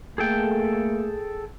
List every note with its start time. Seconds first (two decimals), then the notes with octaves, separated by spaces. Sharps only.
0.18 A3 A#3 G#4 A4 G5